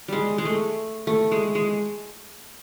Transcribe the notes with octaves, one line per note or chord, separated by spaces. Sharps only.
G3 G#3
G#3
A3
A3
G#3
G#3